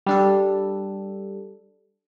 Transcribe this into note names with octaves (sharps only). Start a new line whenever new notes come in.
G3 D4 A4